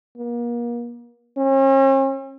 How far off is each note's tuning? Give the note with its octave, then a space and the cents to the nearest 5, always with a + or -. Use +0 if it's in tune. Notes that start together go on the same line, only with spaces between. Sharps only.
A#3 +35
C#4 -45